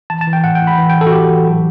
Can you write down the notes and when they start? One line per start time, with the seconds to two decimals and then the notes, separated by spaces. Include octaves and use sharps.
0.10 E3 A5
0.21 A5
0.27 E3
0.33 G5
0.44 A2 F#5
0.55 G5
0.61 A2
0.67 B5
0.78 E3
0.90 G5
0.95 E3
1.01 A4
1.07 F#4
1.12 A2 G4
1.30 E3
1.47 F#3